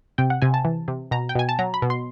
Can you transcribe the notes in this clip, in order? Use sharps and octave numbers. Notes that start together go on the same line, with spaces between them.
C3 G5
F#5
C3 G#5
A5
E3
C3
B2 A#5
G5
B2 G#5
A5
F#3 A#5
B5
B2
C6